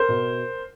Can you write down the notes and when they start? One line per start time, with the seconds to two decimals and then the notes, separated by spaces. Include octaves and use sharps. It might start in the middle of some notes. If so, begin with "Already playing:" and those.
Already playing: A#4 C5
0.09 B2